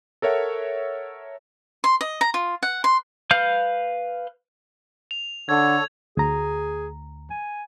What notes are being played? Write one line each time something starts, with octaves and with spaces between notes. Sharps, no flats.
A4 A#4 C#5 E5 F#5
C6
D#5
A#5
F4
F#5
C6
B4 F5 F6 G6
F7
D3 A4 C#5 G#6
D2 G#4 A#5
G#5